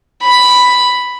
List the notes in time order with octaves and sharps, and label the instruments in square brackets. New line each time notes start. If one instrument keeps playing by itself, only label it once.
[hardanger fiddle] B5